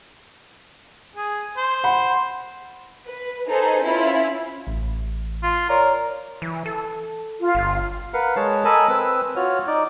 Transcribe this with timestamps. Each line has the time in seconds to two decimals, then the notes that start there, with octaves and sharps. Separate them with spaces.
1.16 G#4
1.57 C5
1.84 F#5 B5
3.07 B4
3.49 D#4 G#4 A4 B4 C5
3.86 C#4 E4 F4 B5
4.67 A1
5.43 F4
5.69 A#4 C#5 D5 A#5
6.42 E3
6.66 A4
7.40 F4
7.55 G1
8.14 A#4 B4 F5 F#5
8.36 G#3 C#5 A5
8.65 A4 A#4 D#5 G#5 A5 B5
8.88 C4 B4 E6
9.36 F4 F#4 C#5 F6
9.67 D#4 D5